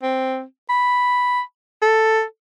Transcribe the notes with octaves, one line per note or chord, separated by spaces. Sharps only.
C4
B5
A4